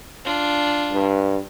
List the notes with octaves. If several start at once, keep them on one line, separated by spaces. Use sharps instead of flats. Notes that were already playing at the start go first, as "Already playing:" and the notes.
D4 F4
G2